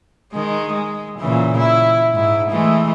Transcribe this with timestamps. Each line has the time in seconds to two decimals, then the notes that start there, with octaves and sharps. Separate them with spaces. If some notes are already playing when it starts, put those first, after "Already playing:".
0.33 D#3 G#3
0.72 G#3
1.19 A#2 C#3 E3
1.58 E4
2.14 G#2 E4
2.49 E3 G#3 A3